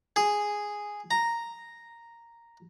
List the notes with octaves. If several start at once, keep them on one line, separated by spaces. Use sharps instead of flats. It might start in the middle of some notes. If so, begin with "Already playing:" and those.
G#4
A#5